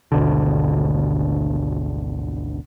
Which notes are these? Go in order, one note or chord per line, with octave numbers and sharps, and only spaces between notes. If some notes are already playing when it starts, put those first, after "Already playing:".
G#1 D2 B2 D3